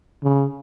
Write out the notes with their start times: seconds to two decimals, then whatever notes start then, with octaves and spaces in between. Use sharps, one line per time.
0.24 C#3